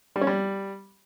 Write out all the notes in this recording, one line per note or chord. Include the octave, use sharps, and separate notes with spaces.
G3
C#4
G3